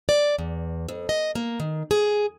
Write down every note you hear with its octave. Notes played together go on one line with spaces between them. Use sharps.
D5
E2
F2
D#5
A#3
D#3
G#4